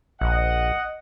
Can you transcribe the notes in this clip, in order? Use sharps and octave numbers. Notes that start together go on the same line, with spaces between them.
A#1 D#5 F#5